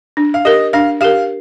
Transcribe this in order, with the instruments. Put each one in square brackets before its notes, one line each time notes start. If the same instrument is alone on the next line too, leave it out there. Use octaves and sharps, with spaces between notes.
[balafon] D4
[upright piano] F5
[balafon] G4 A#4 [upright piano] D#5
[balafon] D4 [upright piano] F5
[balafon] G4 A#4 [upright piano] F5